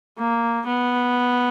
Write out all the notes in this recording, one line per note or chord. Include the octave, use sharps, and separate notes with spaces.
A#3
B3